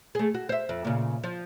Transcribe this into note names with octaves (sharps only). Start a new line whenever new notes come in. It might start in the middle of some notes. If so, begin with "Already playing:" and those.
A3 G#4
F#4
C5 E5
F2
A#2 C#3
F3